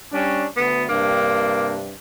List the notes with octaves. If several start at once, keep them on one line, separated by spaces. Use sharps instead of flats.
G3 C#4 D4
D2 B3
G2 C3 A#3 D4